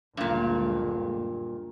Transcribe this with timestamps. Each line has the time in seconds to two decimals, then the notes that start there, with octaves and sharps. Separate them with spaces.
0.17 F#1 D2 G2 A#2 G#3